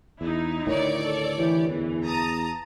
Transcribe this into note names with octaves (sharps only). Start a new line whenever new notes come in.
E2 D#4 E4
D2 A2 D#3 C#5 D5
A4
E3 G4
E2 E3
A5 A#5 D#6